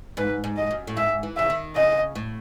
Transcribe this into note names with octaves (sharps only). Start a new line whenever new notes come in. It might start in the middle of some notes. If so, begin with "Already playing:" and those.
G#2 B4
G#2
D#5
F#2
A2
G#2 E5
E3
C#3 E5
D#3
C#3 D#5
A2